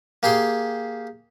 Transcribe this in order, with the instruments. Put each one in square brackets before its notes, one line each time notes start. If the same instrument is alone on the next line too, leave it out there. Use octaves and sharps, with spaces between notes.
[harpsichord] A#3 G4 G#4 C6